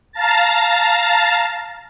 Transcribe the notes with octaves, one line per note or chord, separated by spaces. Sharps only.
F5 A5 A#5 A6